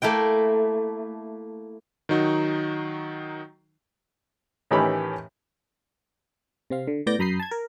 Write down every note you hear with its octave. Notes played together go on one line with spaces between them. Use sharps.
A3 A#3 E4 G5
D#3 F#3 D#4 F#4
A2 D#3 E3 C#4 G4 B5
C3 C4 F5
D3
A2 B3 D5 G6 A#6
F#2 A#5 B5 D#6 G6 C7
A5 G#6
A#4